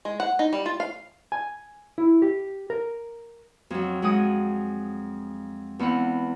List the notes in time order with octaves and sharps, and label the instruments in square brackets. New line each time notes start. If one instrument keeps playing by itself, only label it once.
[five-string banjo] G#3
F#5
D#4
G3
F4
F5
[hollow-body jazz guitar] G#5
E4
G4
A#4
[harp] F2 F#3
F2 G#3 F#5 D#6
E2 B3 C4 F4 F#5